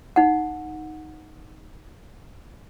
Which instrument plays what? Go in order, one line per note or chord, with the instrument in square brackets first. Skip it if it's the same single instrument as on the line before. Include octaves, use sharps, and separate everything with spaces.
[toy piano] D#4 F#5